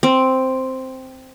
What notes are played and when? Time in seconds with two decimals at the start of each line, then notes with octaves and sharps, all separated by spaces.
0.03 C4